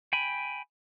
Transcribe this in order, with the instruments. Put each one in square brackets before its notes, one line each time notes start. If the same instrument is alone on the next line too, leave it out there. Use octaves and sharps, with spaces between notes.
[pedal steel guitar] G5 G#5 B5